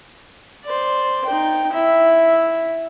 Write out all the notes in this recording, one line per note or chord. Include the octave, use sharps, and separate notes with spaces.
C5 D5
D#4 G5
E4 E5